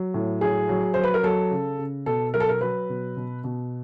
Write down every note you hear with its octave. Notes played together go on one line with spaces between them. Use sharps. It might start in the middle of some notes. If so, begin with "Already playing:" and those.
Already playing: F#3
A2
F#3 G#4
F#3
F#3 C5
B4
A#4
F#3 A4
C#3
C#3
B2 A4
F#3 A#4
A4
A#4
F#3 B4
B2
B2
B2